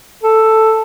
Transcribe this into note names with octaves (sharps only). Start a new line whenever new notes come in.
A4